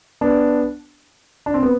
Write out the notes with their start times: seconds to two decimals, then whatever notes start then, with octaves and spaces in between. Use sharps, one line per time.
0.21 B3 D4
1.46 D4
1.54 C4
1.63 B3